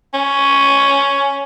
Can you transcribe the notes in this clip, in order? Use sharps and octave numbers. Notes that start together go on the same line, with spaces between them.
C#4